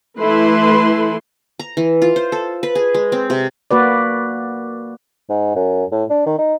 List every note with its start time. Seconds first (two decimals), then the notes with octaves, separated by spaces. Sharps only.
0.17 E3 A3 E4 B4 C6
1.59 A#5
1.77 E3
2.02 F4
2.16 C5
2.32 A4
2.63 B4
2.75 G#4
2.94 G#3
3.12 C4
3.30 C3
3.71 A#3 F#4 B4 D5
5.29 G#2
5.56 F#2
5.91 A2
6.10 D4
6.26 D#3
6.38 D#4